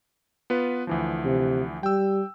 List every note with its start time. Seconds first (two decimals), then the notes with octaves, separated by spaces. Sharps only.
0.50 B3 F4 B4
0.87 D2 E3 F3
1.25 C3
1.83 G3 G5 E6